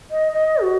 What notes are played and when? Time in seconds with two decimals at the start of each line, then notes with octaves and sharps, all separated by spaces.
0.11 D#5
0.32 D#5
0.62 F#4